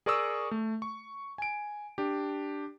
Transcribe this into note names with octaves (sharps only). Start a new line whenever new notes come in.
G#4 A#4 D5 C#6 D#6 E6
A3
C#6
G#5 D7
D4 G4